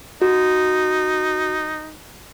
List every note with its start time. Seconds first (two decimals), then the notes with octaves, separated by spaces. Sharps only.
0.22 D#4 F#4